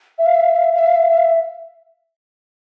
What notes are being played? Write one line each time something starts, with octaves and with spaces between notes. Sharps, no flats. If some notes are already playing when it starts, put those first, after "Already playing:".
E5
F5
E5
F5
E5
F5
E5
F5
E5
F5
E5
F5
E5
F5
E5